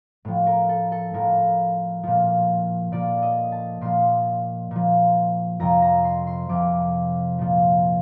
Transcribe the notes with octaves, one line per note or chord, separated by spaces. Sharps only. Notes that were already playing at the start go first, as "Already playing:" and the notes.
A2 F3
A#4
A4
A4
A2 F3 A#4
A#2 F3
A#2 F3 D5
D#5
A5
A#2 F3 C6
A#2 F3
F2 C3 F3 A#5
A#5
C6
C6
F2 C3 F3 D6
A#2 F3